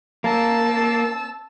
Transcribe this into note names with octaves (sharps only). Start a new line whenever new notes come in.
A#3 A5 E6